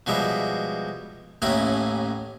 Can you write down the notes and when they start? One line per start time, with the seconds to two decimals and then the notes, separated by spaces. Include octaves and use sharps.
0.06 B2 F3 G3 G#3 E5
1.42 A1 D#2 A2 C#4 A#4 B5